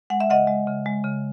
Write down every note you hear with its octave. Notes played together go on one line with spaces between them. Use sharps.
G#3 F#5
E5
C#3 D#5 F#5
G#3
C#3
G#3
C#3